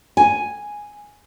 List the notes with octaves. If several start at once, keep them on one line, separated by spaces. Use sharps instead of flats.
G#5